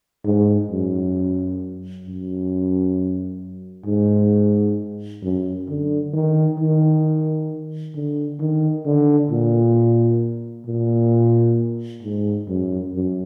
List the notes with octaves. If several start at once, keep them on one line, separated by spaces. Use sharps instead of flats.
G#2
F#2
F#2
G#2
F#2
D3
D#3
D#3
D3
D#3
D3
A#2
A#2
G#2
F#2
F#2